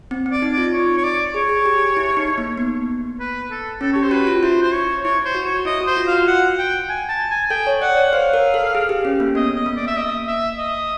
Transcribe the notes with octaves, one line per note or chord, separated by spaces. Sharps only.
C4
C4
D5
D#4
D5
F4
C#5
C#5
D5
G#4 C#5
G#4
G4
E4
D#4
A#3
B3
B4
A4
C#4 A4
G4 C#5
C5
F#4 B4
F4
E4 C5
C5
C#5
E4 C#5
C5
F#4
C#5
E4 D#5
F#4
C5
F4
F#4 F5
F#5
G5
G#5
A5
G#5
A4 G5
C#5
D5 F#5
C#5
C5 F5
A#4
A4
G#4
G4
C#4
A#3
B3 D#5
D#5
A#3
D5
E5
D#5
E5
D#5